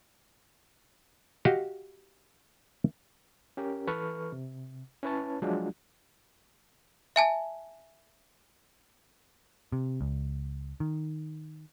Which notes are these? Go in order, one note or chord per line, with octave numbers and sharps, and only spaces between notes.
F#4 G4 D#5 F5
C#4 G4 A#4
E3 A4 B4 C#6 F6
C3
C#4 E4 B4 C#5 A5
F3 F#3 G#3 D4 F4 F#4
E5 G#5 A5
C3
C#2
D#3